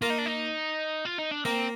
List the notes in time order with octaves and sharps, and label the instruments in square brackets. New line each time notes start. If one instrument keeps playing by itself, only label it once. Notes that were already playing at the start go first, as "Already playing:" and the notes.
[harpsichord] A#3 A#4 [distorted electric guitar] F4
[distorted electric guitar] D#4
D4
D#4
F4
D#4
D4
[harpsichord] A#3 A#4 [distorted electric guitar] C4